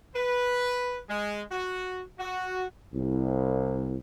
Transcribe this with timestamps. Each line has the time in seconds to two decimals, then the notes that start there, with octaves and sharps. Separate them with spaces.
0.15 B4
1.09 G#3
1.52 F#4
2.19 F#4
2.94 C2